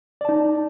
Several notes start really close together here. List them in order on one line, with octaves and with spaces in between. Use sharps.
D5 A5 D#4